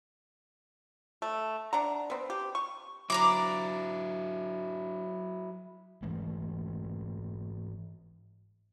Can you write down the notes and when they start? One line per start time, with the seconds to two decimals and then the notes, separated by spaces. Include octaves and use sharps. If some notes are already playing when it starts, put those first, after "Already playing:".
1.22 A3
1.73 D4 F#5 A#5
2.10 B3 C4
2.30 G4
2.55 C#6
3.10 F#3 D4 E4 A#5 D6
6.03 G#2 E3 G#3 A3